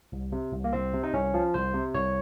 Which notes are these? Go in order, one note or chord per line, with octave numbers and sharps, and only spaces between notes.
C2
C3
C2
A#3
C2 C4
C3
D#4
C2 C#4
F3
C2 C5
C3
C2 C#5